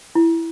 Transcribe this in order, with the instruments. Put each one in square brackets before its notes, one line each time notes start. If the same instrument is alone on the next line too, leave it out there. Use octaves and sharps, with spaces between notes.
[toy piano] E4